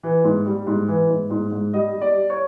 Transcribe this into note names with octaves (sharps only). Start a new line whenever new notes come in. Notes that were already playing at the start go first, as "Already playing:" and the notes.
E3
G#2
G3
G#2
E3
G#2
G#2
G#2
G3 D#5
G3
D5
G3
C#5